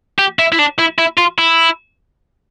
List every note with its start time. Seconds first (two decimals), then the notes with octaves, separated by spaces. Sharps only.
0.19 G4
0.39 E4
0.52 E4
0.59 D4
0.79 E4
0.98 E4
1.18 F4
1.39 E4